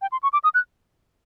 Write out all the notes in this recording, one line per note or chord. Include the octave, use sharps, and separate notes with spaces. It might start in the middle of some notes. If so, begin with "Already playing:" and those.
G5
C6
C#6
D6
D#6
F#6